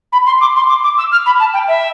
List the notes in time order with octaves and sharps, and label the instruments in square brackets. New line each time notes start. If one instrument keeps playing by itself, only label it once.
[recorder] B5
C6
D6
C6
D6
D6
E6
F6
B5
A5
G5
E5